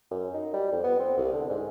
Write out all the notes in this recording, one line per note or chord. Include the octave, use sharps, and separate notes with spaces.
F#2
D#4
G3
F2
B3
C4
C2
D3
G#2